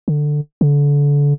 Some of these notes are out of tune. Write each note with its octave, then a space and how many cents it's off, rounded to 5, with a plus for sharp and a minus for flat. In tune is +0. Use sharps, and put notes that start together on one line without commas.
D3 +10
D3 -30